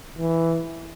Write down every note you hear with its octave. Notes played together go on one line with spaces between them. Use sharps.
E3